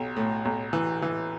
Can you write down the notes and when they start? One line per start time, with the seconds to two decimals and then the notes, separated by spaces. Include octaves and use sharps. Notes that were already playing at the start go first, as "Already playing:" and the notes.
Already playing: B1
0.16 A2
0.45 B1
0.73 E3
1.02 E3